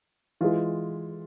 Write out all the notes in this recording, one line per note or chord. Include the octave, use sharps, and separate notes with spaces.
E3 G#3 F4